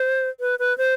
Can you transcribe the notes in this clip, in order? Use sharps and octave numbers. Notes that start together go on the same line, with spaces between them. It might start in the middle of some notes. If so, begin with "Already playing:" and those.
Already playing: C5
B4
B4
C5